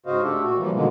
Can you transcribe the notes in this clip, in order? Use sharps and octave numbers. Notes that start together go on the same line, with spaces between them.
G#2 C#3 F#4 C5 D#5 F5
A3 D4 G4 A4
A#2 F#4
E3 F3 G3 A#3
B2 D3 D#3 F3 G#3 A#3